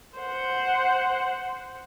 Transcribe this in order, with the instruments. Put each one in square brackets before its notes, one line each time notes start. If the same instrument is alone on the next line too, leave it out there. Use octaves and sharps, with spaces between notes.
[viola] C5 F#5